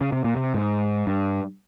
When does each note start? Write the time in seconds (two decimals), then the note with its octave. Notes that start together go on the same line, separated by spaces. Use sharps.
0.01 C#3
0.12 C3
0.24 A#2
0.36 C3
0.54 G#2
1.07 G2